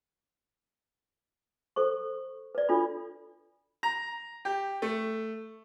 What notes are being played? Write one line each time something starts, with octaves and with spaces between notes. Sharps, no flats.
A4 C5 C#6
B4 D5
D4 F4 A4 B5
A#5
G4
A3